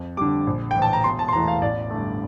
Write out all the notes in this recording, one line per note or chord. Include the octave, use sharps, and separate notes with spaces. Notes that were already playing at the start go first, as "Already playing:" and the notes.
Already playing: F2
D3 G3 D6
A#1
A2 E3 G5
A5
A#5
E1 C6
A5
C6
E2 E3 A3 A#5
F5
A1 D5
G2 D3 A3